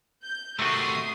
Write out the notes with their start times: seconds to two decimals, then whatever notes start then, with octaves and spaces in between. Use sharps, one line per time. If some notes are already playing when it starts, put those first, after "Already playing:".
0.23 G6
0.59 C3 D#3 A3 F#4 D#6 C7